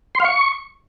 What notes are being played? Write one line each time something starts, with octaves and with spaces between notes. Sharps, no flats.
C6
F5
C#6